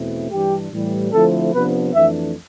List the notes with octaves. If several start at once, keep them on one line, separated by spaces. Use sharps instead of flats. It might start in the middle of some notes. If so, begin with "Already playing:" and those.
Already playing: E2 B2 A3 C4 E4
G2 E3 G3 D4 G4
A2 E3 G3
D3 F3 A3 C4 E4 A4
C3 F3 B3 D4 B4
F2 E3 A3 D4 E5